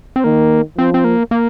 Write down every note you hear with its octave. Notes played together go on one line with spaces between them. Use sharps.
C4
D#3 A#3
F3 C4
C4
A#3
A#3